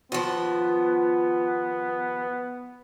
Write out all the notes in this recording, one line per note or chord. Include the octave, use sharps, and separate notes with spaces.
D#2 F3 B3